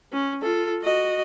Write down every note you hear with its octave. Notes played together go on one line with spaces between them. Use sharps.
C#4
F4 A4
F#4 D#5